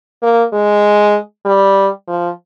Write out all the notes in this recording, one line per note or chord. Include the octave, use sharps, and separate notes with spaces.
A#3
G#3
G3
F3